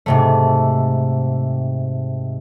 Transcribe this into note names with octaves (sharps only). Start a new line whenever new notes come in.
G#2 C3 A3